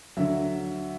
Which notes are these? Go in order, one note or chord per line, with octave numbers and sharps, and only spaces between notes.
D2 D3 F#3 E5